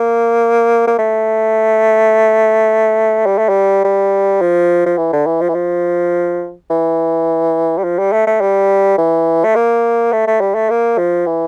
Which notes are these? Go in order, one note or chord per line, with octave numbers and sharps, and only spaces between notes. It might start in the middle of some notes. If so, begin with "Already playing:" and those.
Already playing: A#3
A#3
A3
G3
A3
G3
G3
F3
F3
E3
D3
E3
F3
E3
F3
E3
G3
F3
G3
A3
A3
G3
E3
A3
A#3
A3
A3
G3
A3
A#3
F3
E3